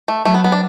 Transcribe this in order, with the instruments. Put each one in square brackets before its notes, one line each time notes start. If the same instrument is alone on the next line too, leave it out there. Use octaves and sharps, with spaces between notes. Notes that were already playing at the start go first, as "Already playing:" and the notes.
[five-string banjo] A3
[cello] F#3 [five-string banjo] A3
[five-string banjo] B3
B3
D4